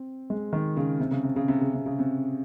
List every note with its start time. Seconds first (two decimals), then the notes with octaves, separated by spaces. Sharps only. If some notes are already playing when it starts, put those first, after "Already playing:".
Already playing: C4
0.30 G#3
0.53 D#3
0.77 C#3
1.00 C3
1.11 C#3
1.23 C3
1.36 C#3
1.48 C3
1.61 C#3
1.74 C3
1.86 C#3
1.99 C3